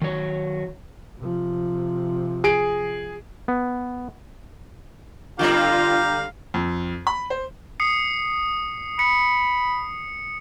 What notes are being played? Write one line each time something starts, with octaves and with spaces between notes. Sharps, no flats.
D#3 F#3 C#5
C3 F3
G#4 D7
B3
D3 G3 C4 F4 G4 F5 A#5
F2
B5
C5
D#6 C7 C#7
B5 C#7